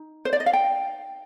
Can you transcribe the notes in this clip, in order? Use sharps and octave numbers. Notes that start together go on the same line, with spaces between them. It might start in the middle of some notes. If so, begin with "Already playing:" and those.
Already playing: D#4
C5
D5
D#5
F5
G5